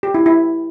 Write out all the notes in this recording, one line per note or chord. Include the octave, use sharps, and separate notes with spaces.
G4
E4
E4